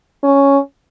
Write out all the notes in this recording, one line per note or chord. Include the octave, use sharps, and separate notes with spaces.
C#4